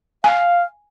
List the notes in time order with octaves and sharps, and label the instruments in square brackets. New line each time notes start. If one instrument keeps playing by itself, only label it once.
[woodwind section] F5 [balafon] G#5